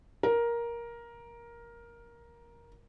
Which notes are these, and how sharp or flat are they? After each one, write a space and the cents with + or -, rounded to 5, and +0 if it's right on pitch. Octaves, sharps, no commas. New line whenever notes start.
A#4 +10